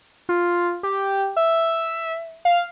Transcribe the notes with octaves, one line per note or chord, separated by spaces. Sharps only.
F4
G4
E5
F5